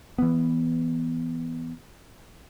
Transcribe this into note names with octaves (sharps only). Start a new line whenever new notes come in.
E3 B3